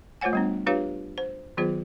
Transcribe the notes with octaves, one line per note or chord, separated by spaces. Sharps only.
A3 F4 C5 C#5 F#5 G#5
G3 B3 D4
D4 F4 G4 B4 C#5 F5
C5
D#3 F#3 B3 F4 G#4 C5